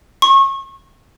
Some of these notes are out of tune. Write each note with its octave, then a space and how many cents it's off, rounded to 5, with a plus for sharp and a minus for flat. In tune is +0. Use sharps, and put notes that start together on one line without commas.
C#6 -30